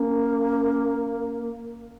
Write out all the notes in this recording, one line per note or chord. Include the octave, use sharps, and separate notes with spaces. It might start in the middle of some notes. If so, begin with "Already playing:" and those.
Already playing: A#3 C#4